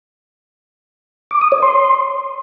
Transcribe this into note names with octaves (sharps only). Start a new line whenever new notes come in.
D6
D#6
C#5
C6